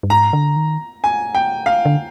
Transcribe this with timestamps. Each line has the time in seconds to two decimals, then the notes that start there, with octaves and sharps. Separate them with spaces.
0.03 G2
0.10 G#2 A#5
0.33 D3
0.56 D#3
1.04 G#5
1.35 G5
1.66 F5
1.85 D3